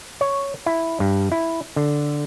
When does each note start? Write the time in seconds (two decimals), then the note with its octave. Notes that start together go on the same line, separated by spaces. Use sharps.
0.21 C#5
0.66 E4
1.00 G2
1.32 E4
1.76 D3